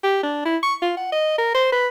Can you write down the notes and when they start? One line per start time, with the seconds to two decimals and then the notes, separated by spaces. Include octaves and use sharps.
0.04 G4
0.23 D4
0.45 E4
0.63 C#6
0.82 F4
0.97 F#5
1.12 D#5
1.38 A#4
1.55 C5
1.72 B4